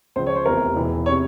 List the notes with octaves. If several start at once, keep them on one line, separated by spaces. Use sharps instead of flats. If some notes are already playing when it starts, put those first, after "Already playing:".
C#2 C#3 F3 C5
C#5
C5
F1 E2 C3 A#4
E1 E2 E3
C#5
C3